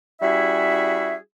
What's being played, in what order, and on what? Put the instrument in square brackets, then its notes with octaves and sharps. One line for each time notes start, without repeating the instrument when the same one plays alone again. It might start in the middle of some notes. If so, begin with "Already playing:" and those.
[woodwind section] G3 C#4 E4 F#4 G#4 E5